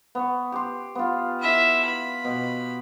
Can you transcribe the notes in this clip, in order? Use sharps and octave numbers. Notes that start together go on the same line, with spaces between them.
B3 C#6
G4 C6
B3 F4
E4 E5
B5
B2